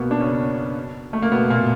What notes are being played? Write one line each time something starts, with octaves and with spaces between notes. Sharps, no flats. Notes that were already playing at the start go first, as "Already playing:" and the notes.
Already playing: B2 A#3 B3
D4
C#3 C#4
A3
A#3
B2 B3
A#2 A#3